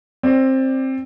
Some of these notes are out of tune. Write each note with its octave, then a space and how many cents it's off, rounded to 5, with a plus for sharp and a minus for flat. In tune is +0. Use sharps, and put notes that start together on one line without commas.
C4 +15 D5 +5